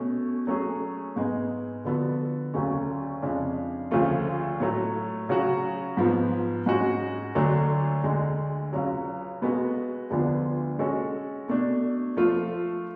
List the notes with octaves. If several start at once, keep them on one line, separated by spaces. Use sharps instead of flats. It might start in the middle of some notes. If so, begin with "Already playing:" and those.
Already playing: B2 A3 C#4
F#3 A3 C#4 G#4
G#2 G#3 B3
D3 F3 B3 F#4 A4
D2 C#3 F#3 A3 C#4
F2 C#3 G#3 D4
D2 C#3 F3 A3 F4
A2 F#3 A3
C#3 F#3 C#4 F#4
G#2 F3 B3
G#2 G#3 C#4 F#4
D2 D3 F#3 A3 D4
D2 D3 G#3
C#2 C#3 F#3
B2 G#3 B3 F#4 A4
D2 D3 F3 B3 D4
G#3 C#4 F#4 A4 C#5
B2 A3 D4
F3 A3 F4